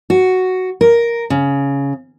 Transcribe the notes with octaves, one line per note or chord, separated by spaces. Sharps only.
F#4
A#4
C#3